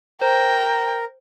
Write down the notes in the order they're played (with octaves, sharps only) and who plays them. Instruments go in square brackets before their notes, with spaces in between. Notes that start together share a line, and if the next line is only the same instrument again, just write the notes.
[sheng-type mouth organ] A#4 [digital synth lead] C5 [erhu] G5 [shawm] A#5